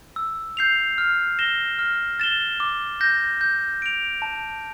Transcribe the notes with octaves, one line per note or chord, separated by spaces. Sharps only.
E6
G6 C7 F7
F6
A#6 E7 G7
F6
A6 E7 G7
D6
G6 A#6
G6
D7 F7
A5